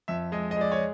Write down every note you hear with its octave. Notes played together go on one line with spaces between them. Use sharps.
F2 E5
G#3 D#5
D#5
G#3 D5
C#5